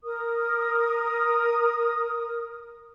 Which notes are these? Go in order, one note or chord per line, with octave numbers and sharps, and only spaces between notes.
A#4 D#6